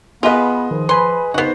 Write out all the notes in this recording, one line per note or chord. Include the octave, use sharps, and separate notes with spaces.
B3 F4 G#4 B4 D#5
D#3 F3
B4 G#5 B5 C6
C#3 B3 D#4 F#4 C5